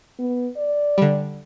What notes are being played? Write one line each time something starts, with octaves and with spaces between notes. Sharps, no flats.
B3
D5
D3 G3